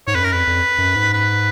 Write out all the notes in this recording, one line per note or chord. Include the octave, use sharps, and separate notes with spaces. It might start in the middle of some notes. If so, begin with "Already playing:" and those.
G#2 C#5
F2 B4
F#2 A#4
F2 B4
F2
F#2
G#2
B4